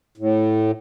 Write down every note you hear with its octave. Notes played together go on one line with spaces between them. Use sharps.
A2